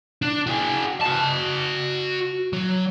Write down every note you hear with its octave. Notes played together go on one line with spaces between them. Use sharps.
D4
F#4 G#4
F#4 A5
F#3